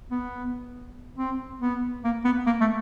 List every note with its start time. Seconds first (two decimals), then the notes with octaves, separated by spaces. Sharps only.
0.11 B3
1.18 C4
1.61 B3
2.04 A#3
2.25 B3
2.46 A#3
2.61 A3